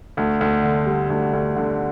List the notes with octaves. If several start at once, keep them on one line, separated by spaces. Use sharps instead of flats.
D2
D2
D3
G3
D2
D2
D3